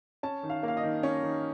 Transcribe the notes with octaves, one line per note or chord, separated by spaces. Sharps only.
C#4 A5
D#3
F5
A#3 F5
D#5
D#3
C#4
D#3